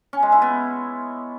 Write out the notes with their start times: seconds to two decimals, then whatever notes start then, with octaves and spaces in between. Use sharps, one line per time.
0.13 C#4
0.23 G#3
0.32 E4
0.42 B3